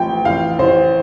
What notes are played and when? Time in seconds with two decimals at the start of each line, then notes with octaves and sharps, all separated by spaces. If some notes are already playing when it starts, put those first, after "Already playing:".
Already playing: A1 A2 F3 G5
0.25 A1 F5
0.59 A1 C5